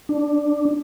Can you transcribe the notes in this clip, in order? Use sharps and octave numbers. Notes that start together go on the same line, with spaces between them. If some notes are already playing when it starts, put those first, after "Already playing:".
D4